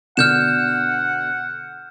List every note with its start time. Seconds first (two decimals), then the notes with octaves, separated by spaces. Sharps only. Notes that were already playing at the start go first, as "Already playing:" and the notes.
0.17 B2 D3 D4 F#5 F6 G6 E7